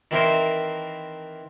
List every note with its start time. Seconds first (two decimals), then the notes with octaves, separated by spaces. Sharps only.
0.11 D#3 E3 C4 E4 A#4 C5